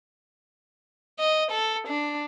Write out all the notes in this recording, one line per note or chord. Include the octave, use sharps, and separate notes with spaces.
D#5
A4
D4